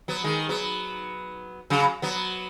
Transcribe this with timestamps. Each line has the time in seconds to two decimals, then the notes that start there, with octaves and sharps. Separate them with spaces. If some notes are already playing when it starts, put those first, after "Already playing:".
0.08 F#3 B3
0.24 D#3 G#3
0.49 F#3 B3
1.70 C#3 F#3
2.02 F#3 B3